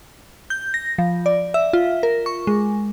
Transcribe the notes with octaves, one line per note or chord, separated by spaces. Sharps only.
G6
A#6
F3
D5
E5
F4
A#4
C#6
G#3